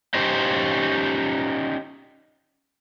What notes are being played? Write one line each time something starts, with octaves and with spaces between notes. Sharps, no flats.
C#4 D#4 G4 C5